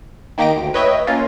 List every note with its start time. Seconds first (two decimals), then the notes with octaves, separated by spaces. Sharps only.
0.38 D#3 A#3 D#4 G4 A#6 D7
0.56 D2
0.74 B4 C#5 D#5 E5 G5
1.07 A#3 C#4 F4